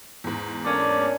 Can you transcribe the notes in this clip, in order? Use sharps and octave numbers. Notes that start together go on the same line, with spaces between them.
E2 G#2
A#3 C#4 D4 A4 A#4 D5